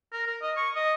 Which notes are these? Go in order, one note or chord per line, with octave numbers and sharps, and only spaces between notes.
A#4
A#4
D#5
C#6
D#5